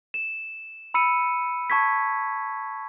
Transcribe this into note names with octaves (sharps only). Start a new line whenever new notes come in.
E7
B5 E6 C#7 D#7
A5 C#6 G#6 B6